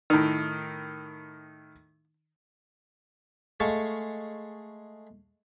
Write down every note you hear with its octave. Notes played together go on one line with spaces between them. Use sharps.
A2 D#3
G#3 A3 F5 A5 C#6